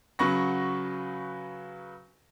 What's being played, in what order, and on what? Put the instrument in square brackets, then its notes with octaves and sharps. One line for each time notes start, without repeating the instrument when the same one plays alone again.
[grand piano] C#3 F#3 B4 C#6 A#6